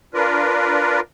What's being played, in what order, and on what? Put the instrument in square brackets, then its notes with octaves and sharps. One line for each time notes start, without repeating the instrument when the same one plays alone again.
[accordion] D4 F4 A#4 B4